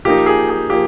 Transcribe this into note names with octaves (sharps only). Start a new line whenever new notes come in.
F3 A#3 D#4 G4
G#4
G#4
F3 A#3 G4